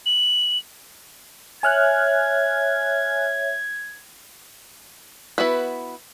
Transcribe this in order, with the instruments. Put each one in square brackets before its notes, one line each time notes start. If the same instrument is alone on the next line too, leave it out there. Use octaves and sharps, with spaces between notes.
[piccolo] F#7
[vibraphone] C#5 E5 [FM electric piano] G#5 F6 F#6 [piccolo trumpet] G#6
[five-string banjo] B3 E4 F#4 B4